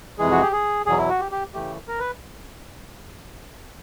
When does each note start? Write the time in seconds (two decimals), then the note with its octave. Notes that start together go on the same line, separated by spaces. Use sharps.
0.18 F2 C3 E3 G#3 G#4
0.31 F#4
0.42 G4
0.52 G#4
0.86 E2 B2 F#3 G#4
0.98 E4
1.09 F#4
1.20 G4
1.32 G4
1.54 C#3 E3 A3 G4
1.88 A#4
1.99 B4